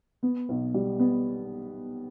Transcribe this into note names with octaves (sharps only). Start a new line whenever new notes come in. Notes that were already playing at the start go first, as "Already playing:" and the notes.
B3
B1
G3
B3